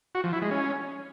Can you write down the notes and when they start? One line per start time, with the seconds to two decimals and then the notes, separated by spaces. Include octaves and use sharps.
0.15 F#4
0.24 F3
0.33 E4
0.42 G#3
0.51 C#4